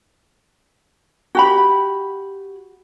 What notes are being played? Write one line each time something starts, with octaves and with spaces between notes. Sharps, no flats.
F#4 G4 B5